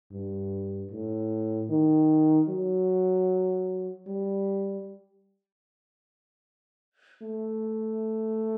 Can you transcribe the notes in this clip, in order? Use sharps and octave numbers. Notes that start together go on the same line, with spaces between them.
G2
A2
D#3
F#3
G3
A3